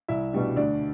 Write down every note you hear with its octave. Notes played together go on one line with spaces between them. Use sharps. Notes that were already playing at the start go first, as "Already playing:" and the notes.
C2 E4 E5
B2 G3 D4
D2 D4 D5